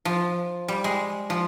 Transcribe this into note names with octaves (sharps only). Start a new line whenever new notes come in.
F3
G3
G#3
F3